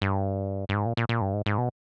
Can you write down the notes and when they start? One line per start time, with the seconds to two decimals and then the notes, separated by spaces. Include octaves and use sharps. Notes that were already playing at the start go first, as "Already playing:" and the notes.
0.01 G2
0.69 G2
0.74 G#2
0.86 A#2
0.97 A#2
1.09 A#2
1.21 G2
1.33 G#2
1.46 G#2
1.58 B2